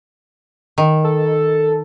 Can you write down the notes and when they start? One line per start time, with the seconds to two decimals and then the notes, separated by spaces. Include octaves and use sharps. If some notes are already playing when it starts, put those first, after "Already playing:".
0.78 D#3
1.04 A4